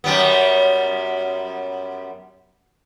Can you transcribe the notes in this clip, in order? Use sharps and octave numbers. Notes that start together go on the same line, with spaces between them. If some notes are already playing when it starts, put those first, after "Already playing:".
F#2 G3 B3